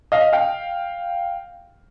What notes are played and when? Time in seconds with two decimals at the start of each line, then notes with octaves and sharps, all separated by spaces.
0.12 D#5 F5
0.33 F5 G5